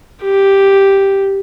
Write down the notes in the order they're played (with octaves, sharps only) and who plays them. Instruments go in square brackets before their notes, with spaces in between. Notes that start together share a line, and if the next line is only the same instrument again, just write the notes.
[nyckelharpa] G4